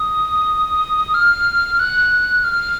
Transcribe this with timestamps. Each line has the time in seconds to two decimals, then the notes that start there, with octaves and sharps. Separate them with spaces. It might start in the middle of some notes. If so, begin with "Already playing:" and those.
Already playing: D#6
1.14 F6
1.79 F#6
2.44 F6